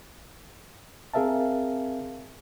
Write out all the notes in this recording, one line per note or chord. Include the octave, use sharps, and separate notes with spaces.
C4 G#4 A#4 E5 F5 A5